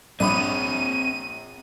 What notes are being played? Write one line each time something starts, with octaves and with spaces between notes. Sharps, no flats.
A#1 C4 C#5 B5 D#6 D#7